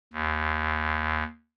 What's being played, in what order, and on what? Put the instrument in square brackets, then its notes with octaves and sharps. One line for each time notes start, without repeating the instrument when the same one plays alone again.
[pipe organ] D#2